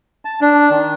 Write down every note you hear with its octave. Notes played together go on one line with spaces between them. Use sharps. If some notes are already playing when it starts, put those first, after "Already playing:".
A5
D4
D#3